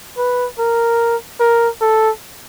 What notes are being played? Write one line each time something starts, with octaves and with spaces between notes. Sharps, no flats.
B4
A#4
A#4
A4